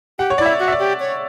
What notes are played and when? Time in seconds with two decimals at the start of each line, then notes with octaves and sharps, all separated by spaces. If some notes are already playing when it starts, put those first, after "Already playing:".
0.19 G4 F#5
0.30 C#5
0.38 E4 D5
0.46 E5
0.59 F#4
0.68 E5
0.72 D5
0.79 G4
1.00 C#5